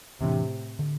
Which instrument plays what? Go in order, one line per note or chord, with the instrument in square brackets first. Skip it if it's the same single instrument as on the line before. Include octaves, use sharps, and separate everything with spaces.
[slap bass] F2 E3 A#3 D4 [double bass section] A2 C3
[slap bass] D3